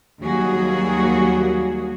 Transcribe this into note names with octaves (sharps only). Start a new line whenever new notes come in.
D#2 F#3 G3 A#3 F#4 G#4